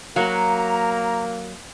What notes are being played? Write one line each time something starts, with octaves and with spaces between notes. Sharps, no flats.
F#3 A#3 F#4 A#4 F5 A#5